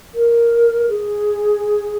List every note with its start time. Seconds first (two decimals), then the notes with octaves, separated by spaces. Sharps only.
0.15 A#4
0.89 G#4